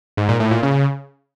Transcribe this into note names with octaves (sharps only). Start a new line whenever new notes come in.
G#2
A#2
A2
A#2
C#3